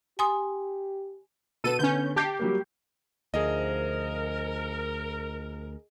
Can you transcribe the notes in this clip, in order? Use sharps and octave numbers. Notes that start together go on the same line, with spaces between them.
G4 G#5 C6 D#6
B2 B3 A4 D#7
D3 B3 C#4 G6
G4 A5 G6 C7
F#3 G3 A#3
D2 F3 D4 D#4 G#4 A#4 D#5